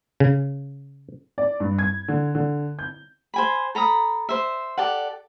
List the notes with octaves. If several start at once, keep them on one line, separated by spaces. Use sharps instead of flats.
C#3
D5
G2
G#6
D3
D3
G6
C5 G#5 B5
A4 A#5 B5 D#6
C5 E5
G4 A4 D5 F#5